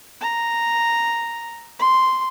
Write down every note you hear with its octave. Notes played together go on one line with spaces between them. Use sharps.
A#5
C6